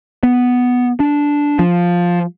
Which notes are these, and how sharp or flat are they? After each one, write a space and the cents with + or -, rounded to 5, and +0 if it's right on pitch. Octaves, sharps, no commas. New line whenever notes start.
B3 +0
D4 -10
F3 +5